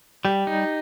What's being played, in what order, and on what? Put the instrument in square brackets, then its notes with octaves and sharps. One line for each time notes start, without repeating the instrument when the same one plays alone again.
[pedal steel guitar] G3 [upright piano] G4
[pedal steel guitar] D#4